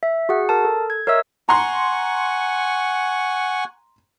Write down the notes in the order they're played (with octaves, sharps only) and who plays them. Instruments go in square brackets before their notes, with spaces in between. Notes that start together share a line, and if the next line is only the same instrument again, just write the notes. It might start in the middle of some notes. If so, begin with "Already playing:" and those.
[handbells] E5
F#4 G#4 F#5
A#4 A5
A4
G#6
A#4 C#5 D#5 E5 E6
[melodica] F#5 G#5 C#6 [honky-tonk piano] A#5 C6